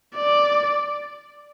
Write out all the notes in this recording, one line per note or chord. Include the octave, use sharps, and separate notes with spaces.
D5